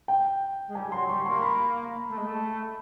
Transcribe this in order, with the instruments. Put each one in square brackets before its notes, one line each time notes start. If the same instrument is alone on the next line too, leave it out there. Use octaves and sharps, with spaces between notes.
[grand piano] G5
[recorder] G#3
[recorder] G3 [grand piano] G#5
[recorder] F#3 [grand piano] C6
[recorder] G3 [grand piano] C#6
[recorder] A#3 [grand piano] C6
[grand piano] B5
[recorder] A3
G#3
A3